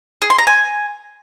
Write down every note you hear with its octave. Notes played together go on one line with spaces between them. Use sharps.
G#4
C6
A#5
G#5